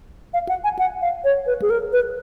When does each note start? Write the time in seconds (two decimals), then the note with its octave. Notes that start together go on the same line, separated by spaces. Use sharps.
0.34 F5
0.49 F#5
0.64 G#5
0.79 F#5
1.02 F5
1.24 C#5
1.47 B4
1.62 G#4
1.70 A#4
1.93 B4